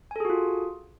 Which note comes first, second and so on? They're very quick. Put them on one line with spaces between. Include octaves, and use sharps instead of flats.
G#5 A4 G#4 F#4 F4